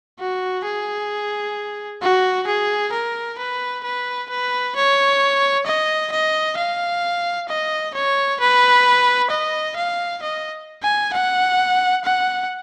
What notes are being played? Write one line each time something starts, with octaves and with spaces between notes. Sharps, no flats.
F#4
G#4
F#4
G#4
A#4
B4
B4
B4
C#5
D#5
D#5
F5
D#5
C#5
B4
D#5
F5
D#5
G#5
F#5
F#5